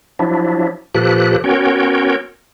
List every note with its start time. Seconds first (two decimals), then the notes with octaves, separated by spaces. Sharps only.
0.19 F3 F#3 D4 E4
0.95 A#2 F3 G4 A4 B4 F#6
1.44 B3 C#4 F#4 A#4 C#5 G5